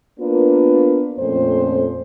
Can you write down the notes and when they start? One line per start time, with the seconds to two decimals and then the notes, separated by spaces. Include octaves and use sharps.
0.20 A#3 B3 D4 F4 A#4 B4
1.18 F2 A#2 A3 C#4 C5